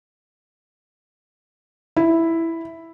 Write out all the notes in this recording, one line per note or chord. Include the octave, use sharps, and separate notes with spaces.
E4